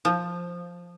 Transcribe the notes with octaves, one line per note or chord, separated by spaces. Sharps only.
F3